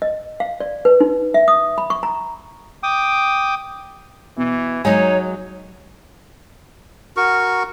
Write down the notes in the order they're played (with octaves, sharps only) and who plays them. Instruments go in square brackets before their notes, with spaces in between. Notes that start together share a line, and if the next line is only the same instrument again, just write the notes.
[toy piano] D#5
F5
D5
B4
D#4
E5
D#6
B5
C#6
A#5
[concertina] G5 D6 D#6
[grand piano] B2 [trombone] E3
[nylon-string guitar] F#3 G#3 [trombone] D#4 [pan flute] C#5 [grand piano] G#5
[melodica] F#4 A#4 C#6